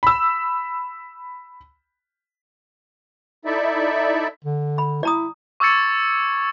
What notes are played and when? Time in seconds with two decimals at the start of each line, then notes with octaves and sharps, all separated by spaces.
0.03 B5 E6
3.45 D#4 E4 A4 D5 E5
4.45 D3
4.78 B5
5.03 E4 D5 A#5 D#6
5.60 C#6 D6 E6 G#6 A6 C#7